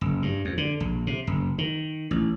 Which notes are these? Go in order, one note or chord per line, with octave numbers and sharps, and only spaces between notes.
F#1
G2
F2
D3
A#1
C3
F#1
D#3
A1